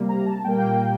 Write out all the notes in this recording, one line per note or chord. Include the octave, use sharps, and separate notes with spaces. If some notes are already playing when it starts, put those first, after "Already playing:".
Already playing: C3 G3 A#3
A#5
A5
A#2 G3 A#3 G5